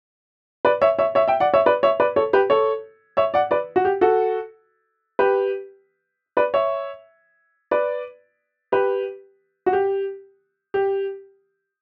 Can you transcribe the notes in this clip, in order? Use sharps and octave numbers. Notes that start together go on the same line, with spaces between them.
B4 D5
C#5 E5
C#5 E5
C#5 E5
E5 G5
D5 F#5
C#5 E5
B4 D5
C#5 E5
B4 D5
A4 C#5
G4 B4
A4 C#5
C#5 E5
D5 F#5
B4 D5
F#4
G4
F#4 A4
G4 B4
B4 D5
C#5 E5
B4 D5
G4 B4
F#4
G4
G4